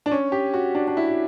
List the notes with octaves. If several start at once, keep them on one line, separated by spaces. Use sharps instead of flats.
D4
C#4
G4
F#4
D4
D4
E4
F#4